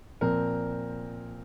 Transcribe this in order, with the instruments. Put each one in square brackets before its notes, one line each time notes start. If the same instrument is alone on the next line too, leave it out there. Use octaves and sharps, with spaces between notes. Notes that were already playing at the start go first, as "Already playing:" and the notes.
[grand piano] A#2 F3 C4 A#4